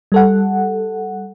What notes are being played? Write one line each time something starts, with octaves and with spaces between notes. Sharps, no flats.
G3 A4 F#5